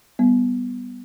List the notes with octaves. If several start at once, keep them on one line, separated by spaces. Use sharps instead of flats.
G3 B3